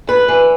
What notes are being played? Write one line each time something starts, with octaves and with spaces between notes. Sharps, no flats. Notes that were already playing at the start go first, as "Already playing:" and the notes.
D2 B4
E3